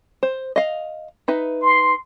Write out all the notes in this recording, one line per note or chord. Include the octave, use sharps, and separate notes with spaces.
C5
D#5 F5
D#4 B4 E5
C6